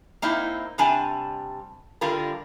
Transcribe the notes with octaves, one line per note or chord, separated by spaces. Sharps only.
A#3 C4 D#4 E4
C3 G3 D4 G#5 A5
D3 G3 F4 A#4